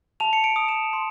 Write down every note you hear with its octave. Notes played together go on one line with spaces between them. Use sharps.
A5 F7
C#7
D7
D#6
E7
C6